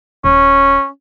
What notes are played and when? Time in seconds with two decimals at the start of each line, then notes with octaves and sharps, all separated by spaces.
0.24 D#1 C#4